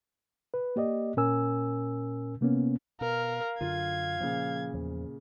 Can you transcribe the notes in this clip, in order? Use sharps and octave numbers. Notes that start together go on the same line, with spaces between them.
B4
A#3 G4 D5 D#5
A#2 C#4 A#4 G#5 E6
C3 A#3 B3 C#4
B2 A#4 F5
F#2 D3 F4 G#6
A#2 C#3 F3
E2 F3